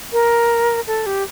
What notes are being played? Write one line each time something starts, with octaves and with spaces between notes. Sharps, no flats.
A#4
A4
G4